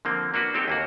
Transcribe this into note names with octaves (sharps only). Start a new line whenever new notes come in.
D3 F3 A#3 C4
A#3 D4 F#4 B4
C4 D#4 G4 A4
D#2 A#3 F#4